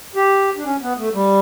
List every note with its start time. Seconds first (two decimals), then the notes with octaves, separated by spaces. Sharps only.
0.15 G4
0.57 D4
0.65 C#4
0.82 B3
0.97 A3
1.13 G3